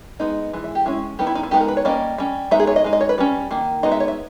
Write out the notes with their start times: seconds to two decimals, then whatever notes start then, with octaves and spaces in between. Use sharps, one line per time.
0.20 G#3 B3 D#4
0.53 E3 G#3
0.64 E5
0.75 G4
0.85 G#3 C#4 E4
1.19 G3 B3 D#4 G4
1.27 E4
1.35 D#4
1.43 E4
1.51 G#3 B3 D#4 G4
1.61 A#4
1.68 B4
1.77 C#5
1.85 G3 A#3 C#4 D#5
2.18 G3 C#4
2.51 G#3 B3 D#4 E5
2.60 G#4
2.67 C#5
2.76 D#5
2.84 G#3 D#4
2.93 D#5
3.01 C#5
3.09 B4
3.18 G3 C#4
3.51 D#3 A#3 D#4
3.83 G#3 B3 D#4 D#5
3.92 E5
4.00 C#5
4.08 E5